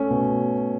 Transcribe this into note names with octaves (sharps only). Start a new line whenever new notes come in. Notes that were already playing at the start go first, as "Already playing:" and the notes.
Already playing: A3 C#4
B2